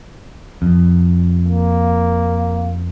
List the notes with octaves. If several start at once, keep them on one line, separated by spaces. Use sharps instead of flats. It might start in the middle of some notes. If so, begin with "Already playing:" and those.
F2
A#3